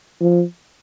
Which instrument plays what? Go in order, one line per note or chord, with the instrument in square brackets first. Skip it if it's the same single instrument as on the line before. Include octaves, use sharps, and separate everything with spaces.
[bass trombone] F3